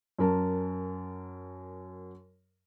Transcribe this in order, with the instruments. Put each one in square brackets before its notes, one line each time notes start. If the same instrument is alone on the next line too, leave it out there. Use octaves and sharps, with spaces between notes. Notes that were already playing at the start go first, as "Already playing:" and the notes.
[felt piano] F#2 A#4 A5